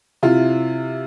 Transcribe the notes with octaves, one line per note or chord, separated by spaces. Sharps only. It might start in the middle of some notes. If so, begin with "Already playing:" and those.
C3 E4 F4